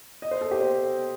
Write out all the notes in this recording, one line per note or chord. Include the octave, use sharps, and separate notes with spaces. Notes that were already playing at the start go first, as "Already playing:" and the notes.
D#5
C5
A4
G4
C5